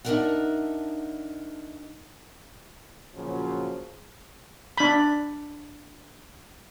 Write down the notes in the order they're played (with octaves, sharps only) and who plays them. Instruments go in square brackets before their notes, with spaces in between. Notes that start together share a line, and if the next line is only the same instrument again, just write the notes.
[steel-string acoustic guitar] D4 D#4 G4 A#4 E5 F#5
[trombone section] A#2 C#3 F3 F#3
[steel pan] D4 B5